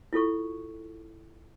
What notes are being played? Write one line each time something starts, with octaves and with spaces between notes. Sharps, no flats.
E4 F4 A4 C#6